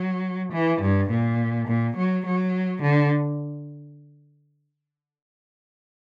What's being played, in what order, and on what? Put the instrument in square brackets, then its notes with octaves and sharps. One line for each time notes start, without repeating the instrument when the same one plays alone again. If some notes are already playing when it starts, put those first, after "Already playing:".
Already playing: [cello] F#3
E3
G2
A#2
A#2
F#3
F#3
D3